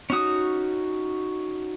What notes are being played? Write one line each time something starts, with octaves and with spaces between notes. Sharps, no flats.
C#4 D#4 F#4 D#6